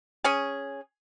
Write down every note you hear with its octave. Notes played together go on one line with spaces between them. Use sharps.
C#4 G#4